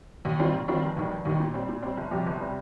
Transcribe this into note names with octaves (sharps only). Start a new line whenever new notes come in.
D#2
D#3 G3 C4 F4
D#2
D#3 G3 C4 F4
F1
D#2 D#3 G3
F1
D#2 D#3 G3
A#2
G3 C4
A#2
G3 C4
G1
F2 C3 G3
G1
C3 G3